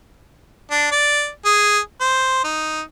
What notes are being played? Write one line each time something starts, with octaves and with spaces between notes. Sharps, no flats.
D4
D5
G#4
C5
D#4